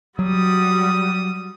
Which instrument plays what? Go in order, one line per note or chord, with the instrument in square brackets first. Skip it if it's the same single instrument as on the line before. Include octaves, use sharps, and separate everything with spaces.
[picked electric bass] F#3 [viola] G3 F#4 [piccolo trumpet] D#6